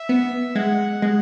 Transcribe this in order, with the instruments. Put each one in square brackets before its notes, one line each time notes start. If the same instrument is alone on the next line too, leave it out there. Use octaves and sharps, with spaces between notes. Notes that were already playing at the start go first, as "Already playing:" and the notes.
Already playing: [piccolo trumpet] E5
[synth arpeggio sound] B3
[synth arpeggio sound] G#3 [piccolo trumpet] F#5
[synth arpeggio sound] G#3